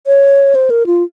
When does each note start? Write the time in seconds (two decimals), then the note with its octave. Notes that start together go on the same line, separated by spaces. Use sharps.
0.07 C#5
0.55 C5
0.70 A#4
0.86 F4